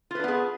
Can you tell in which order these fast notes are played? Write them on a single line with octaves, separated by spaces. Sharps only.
F4 B4 D4 B3 G#4